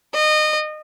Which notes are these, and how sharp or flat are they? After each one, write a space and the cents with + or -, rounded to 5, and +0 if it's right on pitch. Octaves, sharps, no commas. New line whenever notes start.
D#5 -25